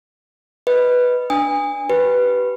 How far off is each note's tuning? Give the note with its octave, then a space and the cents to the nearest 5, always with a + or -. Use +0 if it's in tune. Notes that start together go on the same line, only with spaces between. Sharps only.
B4 +0 D#5 +0
D4 +0 G#5 -30 D#6 +0
G4 -35 B4 +0